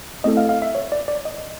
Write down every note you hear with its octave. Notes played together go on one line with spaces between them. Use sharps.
A3 C4 E4 A4 D#5
F5
F5
E5
C#5
D5
D5
D#5